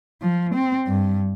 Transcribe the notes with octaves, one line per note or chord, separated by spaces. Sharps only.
F3
C4
G2